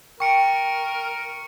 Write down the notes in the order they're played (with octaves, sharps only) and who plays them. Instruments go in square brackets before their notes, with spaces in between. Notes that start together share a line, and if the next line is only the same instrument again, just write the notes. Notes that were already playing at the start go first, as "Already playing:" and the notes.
[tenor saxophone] A#4 [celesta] G5 [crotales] C#6 C#7 D7